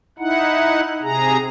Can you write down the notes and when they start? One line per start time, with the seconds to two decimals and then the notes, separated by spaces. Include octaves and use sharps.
0.19 D#4 E4 F#5
1.03 C3 G#4 A#5